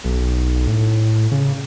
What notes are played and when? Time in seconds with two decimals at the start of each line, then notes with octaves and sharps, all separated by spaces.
0.04 B1
0.67 A2
1.32 C#3